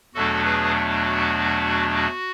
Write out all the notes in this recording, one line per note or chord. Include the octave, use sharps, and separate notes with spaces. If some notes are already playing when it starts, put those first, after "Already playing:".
E2 B2 F#3 A3 D4 F#4 A4
G#4 B4
F#4
F#4